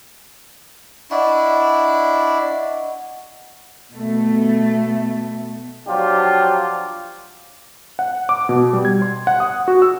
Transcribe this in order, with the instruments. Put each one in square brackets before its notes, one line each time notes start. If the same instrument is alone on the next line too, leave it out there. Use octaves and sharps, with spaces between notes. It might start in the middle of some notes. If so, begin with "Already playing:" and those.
[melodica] D4 E4 [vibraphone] D#5 F#5 C#6
[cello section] B2 A3
[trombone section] F3 F#3 D4 F4 G4
[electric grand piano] F#5
D6
B2
G3
G#6
C6
F#5
D#6
F#4
E6